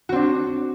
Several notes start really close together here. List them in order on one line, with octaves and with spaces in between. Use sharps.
F#4 C4 D4